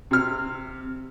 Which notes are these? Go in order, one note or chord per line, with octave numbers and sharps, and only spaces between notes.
C3 F6